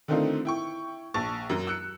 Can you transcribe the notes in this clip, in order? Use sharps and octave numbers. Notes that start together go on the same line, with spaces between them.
D3 D#3 A3 C4 D#4 F4
E4 G5 C#6
A#1 A5 C#6 A6
F#2 F#3
E6 F#6 C#7